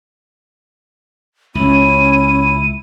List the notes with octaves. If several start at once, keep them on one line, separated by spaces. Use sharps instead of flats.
C#2 C#4 E4 D#7